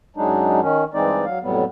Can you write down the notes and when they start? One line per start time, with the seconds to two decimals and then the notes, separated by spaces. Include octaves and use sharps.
0.16 F#2 F#3 G#3 D4 D#4
0.61 D#3 C#4
0.94 G2 E3 G#3 C4 D#4 D5
1.26 F#3 F5
1.42 F2 A2 F#3 G3 B3